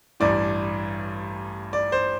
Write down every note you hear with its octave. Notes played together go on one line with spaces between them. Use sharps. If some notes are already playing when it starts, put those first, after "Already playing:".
A1 G2 E3 D5
D5
C5